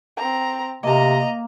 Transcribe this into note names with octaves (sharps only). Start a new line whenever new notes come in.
C4 A#5
C3 A#3 D#5 A#5